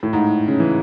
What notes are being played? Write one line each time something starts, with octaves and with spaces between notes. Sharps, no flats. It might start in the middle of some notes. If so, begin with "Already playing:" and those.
A2
G#2
C#3
E3